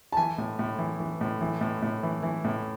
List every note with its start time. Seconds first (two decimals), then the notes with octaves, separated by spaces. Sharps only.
0.12 A5
0.17 E3 G#5
0.38 A2
0.59 A2
0.78 E3
0.99 E3
1.21 A2
1.41 E3
1.61 A2
1.82 A2
2.03 E3
2.23 E3
2.44 A2